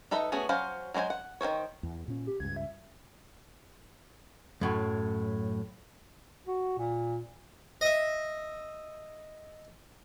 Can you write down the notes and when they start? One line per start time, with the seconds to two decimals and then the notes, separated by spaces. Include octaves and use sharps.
0.11 D#4 A4 B4 D#5 E5
0.32 A3 B3 C#4 F#4 G#4
0.49 F#3 C#4 C5 F5
0.94 F#3 G#3 D4 C5 G#5
1.10 F#5
1.41 D#3 C4 C5 C#5
1.83 E2
2.08 A#2 C#4
2.27 G4
2.40 C#2 G2 G#6
2.56 E5
4.61 F#2 A2 F#3
6.47 F#4
6.78 A#2
7.81 D#5 E5